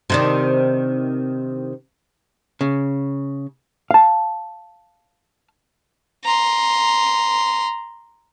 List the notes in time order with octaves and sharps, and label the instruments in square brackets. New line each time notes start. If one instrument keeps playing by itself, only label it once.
[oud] C3 D#3 D4
[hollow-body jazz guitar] C#3
F5 A5
[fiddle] A#5 C6